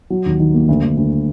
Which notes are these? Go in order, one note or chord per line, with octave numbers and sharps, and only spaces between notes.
F#3
D#2
D#3
A#3
D2
D2
D2